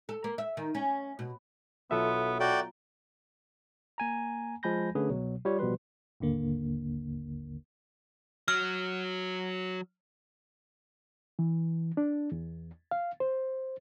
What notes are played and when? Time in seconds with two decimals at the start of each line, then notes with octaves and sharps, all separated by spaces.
0.09 A4
0.24 A#3
0.38 E5
0.57 D#3
0.75 C#4
1.19 B2
1.91 B1 B3 F4 A4 E5 E7
2.40 F#4 D5 G5 A#5
3.98 A#3 G#5 A#5
4.63 F3 G#3 G#5 B5 G6 A#6
4.95 D3 A3 C#4 G#4 B4
5.10 C2 B2 F#3
5.45 G3 F4 C#5
5.59 A1 B2 F3 G3 B4 C6
6.20 G#1 D#2 D3 A#3
8.48 F#3 F6
11.39 E3
11.97 D4
12.32 E2
12.91 F5
13.20 C5